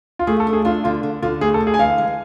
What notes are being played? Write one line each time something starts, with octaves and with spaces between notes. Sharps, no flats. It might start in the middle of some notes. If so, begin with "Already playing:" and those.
F4
A3 G#4
A4
D4
G#4
D4 F4
D3 F4
D3
D3 F4
A3 G#4
A4
D3
G#4
G#5
E3 F5
G#3